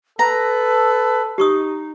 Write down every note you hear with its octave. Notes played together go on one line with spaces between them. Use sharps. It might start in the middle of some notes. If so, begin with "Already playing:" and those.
A4 B4 A#5
D#4 G4 C#6 D#6